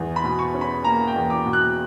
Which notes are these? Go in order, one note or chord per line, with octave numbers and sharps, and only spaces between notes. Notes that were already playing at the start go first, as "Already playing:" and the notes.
Already playing: E2
B5
B2
C#6
C#4
B5
A#3 A#5
G5
E2
D6
B2
F#6